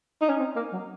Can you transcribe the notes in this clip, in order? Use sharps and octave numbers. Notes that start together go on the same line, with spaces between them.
D#4
C#4
C4
A#3
F#3